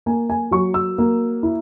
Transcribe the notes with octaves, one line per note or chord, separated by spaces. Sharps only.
A#3 G#5
G#5
F#3 C#6
E6
A#3
E4